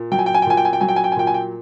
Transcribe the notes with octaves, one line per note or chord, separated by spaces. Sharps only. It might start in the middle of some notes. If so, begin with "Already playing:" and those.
Already playing: A#2
F#3 G5
G#5
G5
G#5
G5
A#2 G#5
G5
G#5
G5
F#3 G#5
G5
G#5
G5
G#5
A#2 G5
G#5
G5